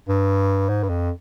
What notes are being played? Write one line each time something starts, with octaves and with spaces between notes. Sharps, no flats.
G2
G#2
G2
F2